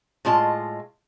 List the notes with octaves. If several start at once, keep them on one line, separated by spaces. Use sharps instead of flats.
A2 G#3 F4 D#5 A5